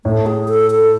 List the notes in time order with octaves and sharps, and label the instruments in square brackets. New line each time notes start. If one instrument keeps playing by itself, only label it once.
[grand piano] A2 [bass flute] A3
[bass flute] G#4
A4
A4